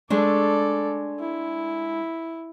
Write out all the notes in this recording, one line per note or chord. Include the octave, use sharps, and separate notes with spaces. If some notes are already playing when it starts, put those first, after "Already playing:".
G#3 A3 D4 A4 D5
E4